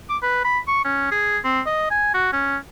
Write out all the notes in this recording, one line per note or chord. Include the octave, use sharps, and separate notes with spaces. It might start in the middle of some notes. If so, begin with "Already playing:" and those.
D6
B4
B5
C#6
C#4
G#4
C4
D#5
G#5
F#4
C#4